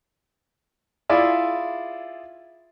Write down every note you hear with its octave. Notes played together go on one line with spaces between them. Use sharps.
E4 F4 G#4 D5 E5